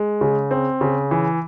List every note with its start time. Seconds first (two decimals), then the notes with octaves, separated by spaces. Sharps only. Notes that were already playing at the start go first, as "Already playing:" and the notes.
Already playing: G#3
0.21 C#3
0.51 C4
0.81 C#3
1.11 E3